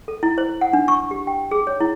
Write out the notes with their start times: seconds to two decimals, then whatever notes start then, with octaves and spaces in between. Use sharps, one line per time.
0.08 A4
0.23 E4
0.38 C5
0.61 F#5
0.73 D4
0.88 C#6
1.11 G4
1.27 G5
1.51 G#4
1.67 C#5
1.80 E4